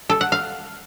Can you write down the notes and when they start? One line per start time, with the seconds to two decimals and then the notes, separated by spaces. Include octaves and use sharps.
0.10 A4
0.21 F#5
0.32 F5